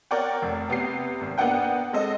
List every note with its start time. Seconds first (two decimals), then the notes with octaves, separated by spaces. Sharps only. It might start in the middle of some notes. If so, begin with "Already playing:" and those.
0.11 A#4 C#5 D5 F#5 G5
0.42 F1
0.68 C3 B3 G4 C7
1.21 G#1
1.38 A#3 B3 D4 F#5 G5
1.93 G#3 C4 A4 D#5